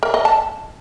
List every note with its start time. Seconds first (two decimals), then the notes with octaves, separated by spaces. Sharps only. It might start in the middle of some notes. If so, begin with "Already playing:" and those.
0.03 A#4
0.14 D#5
0.25 A5